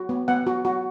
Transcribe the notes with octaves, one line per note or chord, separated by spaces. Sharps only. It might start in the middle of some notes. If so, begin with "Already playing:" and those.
Already playing: F#4
B3
B3 F#5
F#4
F#4